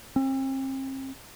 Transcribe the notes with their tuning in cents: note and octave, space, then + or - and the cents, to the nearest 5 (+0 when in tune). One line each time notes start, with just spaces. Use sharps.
C4 +40